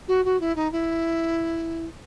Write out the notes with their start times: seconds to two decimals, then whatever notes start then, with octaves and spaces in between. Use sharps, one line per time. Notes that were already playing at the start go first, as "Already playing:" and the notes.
0.08 F#4
0.25 F#4
0.40 E4
0.56 D#4
0.72 E4